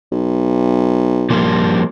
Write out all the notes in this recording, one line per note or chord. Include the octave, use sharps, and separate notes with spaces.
B1
F3 G3 A#3